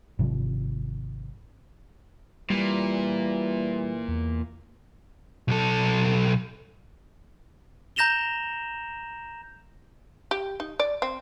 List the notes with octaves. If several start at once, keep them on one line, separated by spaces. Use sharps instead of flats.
G#1 C3 F3
A#2 E3 G3
E2
B1 A4
A#5 G6 A#6 E7 F7 G7
G4
D#4
D5
C4